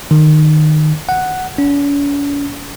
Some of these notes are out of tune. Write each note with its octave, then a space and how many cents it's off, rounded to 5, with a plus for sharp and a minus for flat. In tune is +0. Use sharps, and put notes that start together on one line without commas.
D#3 -20
F#5 +0
C#4 +45